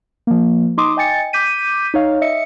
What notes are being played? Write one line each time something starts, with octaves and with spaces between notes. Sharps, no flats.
F3 A#3
D#4 C6 D6 D#6
D#5 G5 G#5 A6 C#7
D6 G6 B6 D#7
D#4 C#5 F5
D#5 E5 C#7